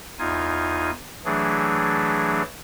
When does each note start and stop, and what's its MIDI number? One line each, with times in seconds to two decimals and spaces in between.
0.19 0.91 40
0.19 0.91 63
0.19 0.91 65
0.19 0.91 80
1.25 2.42 52
1.25 2.42 54
1.25 2.42 57
1.25 2.42 62
1.25 2.42 68